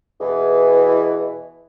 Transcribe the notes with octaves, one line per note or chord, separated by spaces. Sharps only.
E2 B2 E3